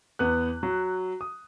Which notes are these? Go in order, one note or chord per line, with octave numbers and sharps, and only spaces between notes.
E2 B3 F#6
F#3
D#6